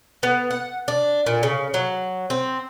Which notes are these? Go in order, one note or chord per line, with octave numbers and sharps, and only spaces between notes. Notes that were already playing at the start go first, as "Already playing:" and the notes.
B3
F#5
D4
A#2
C#3
F#3
C4